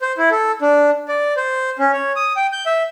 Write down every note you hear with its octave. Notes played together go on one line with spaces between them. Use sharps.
C5
E4
A4
D4
D5
C5
C#4
C#5
D#6
G5
G6
E5